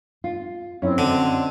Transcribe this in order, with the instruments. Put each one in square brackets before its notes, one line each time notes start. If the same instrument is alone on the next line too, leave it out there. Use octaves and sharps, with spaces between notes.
[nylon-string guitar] F4
[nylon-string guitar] F#2 E4 E5 [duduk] C4 [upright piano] C#4
[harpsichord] D3 [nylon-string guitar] F#4 D#5